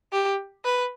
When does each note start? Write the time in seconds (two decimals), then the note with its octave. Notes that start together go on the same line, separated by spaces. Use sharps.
0.13 G4
0.65 B4